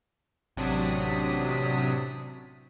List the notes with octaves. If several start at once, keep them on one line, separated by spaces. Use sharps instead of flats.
A1 C3 F#3 D4 D#6 B6